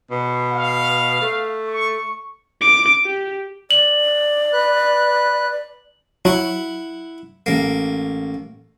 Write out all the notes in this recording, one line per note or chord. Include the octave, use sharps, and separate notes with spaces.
B2
F5
A3
C#6
D6
G4
D5 F#7
B4 F#6
F#3 E4 F#5
A1 A#3